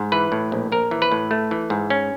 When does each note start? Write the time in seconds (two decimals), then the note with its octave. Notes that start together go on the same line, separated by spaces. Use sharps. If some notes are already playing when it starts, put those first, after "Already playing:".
Already playing: G#2
0.12 E3 B4
0.32 A2
0.52 A#1
0.72 A#1 A#4
0.91 E3
1.02 B4
1.12 A2
1.31 A3
1.51 E3
1.70 G#2
1.90 C#4